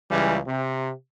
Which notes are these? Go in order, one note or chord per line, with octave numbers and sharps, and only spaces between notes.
C#2 C#3 E3 G3
C3